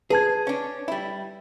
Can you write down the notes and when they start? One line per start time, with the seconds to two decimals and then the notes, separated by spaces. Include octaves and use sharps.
0.10 G#4 B4 A5 G#6
0.47 C#4 D4
0.88 G3 E4